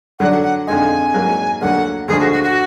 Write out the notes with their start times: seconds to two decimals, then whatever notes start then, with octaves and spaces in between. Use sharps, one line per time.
0.19 D3 F#3 D4 F#5
0.32 F#5
0.43 F#5
0.67 F2 D3 G#3 D#4 G#5
1.14 G#2 F#3 A#3
1.61 D2 D3 F#3 A#3 F#5
2.08 D2 D3 F3 G#3 G#4
2.20 F#4
2.32 F#4
2.43 F#4